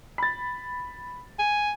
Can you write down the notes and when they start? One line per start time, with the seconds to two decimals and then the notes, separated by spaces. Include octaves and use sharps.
0.18 B5 A6
1.39 G#5